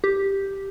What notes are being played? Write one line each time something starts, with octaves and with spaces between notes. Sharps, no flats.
G4